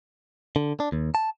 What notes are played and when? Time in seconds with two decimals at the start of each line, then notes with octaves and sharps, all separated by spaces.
0.56 D3
0.80 D4
0.92 D#2
1.15 A5